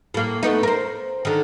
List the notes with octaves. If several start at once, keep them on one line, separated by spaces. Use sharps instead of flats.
A2 A#3
A3 B3 D#4
A#4 C5
D3 D#3